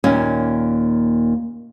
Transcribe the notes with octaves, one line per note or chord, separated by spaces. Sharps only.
D#2 A#2 C#4